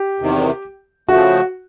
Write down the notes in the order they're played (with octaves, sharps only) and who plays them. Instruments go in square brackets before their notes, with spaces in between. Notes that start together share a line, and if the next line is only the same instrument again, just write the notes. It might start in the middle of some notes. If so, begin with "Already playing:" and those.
Already playing: [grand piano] G4
[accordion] E2 C3 D#3
[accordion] C#3 F3 A3 [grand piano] F#4